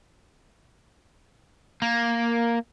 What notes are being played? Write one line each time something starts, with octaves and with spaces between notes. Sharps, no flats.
A#3